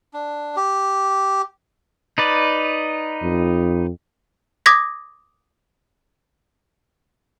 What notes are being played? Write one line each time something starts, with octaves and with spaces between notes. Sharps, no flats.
D4
G4
D#4 B4 D5
F2
D6 D#6 G#6 A#6 B6